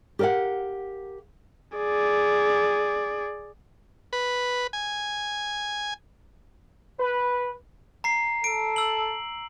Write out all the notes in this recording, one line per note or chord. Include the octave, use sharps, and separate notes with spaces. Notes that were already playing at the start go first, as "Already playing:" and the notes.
G4 A#4 D#5 F5 F#5
G#4 D5
B4
G#5
B4
A#5 C7
A4 D7
E6 F#7